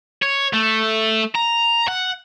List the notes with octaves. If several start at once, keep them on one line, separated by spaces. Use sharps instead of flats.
C#5
A3
A#5
F#5